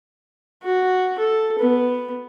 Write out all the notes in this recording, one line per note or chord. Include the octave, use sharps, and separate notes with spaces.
F#4
A4
B3